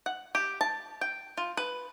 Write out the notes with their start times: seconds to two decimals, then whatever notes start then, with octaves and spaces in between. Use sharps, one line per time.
0.06 F#5
0.35 G4
0.61 A5
1.01 G5
1.37 F4
1.57 B4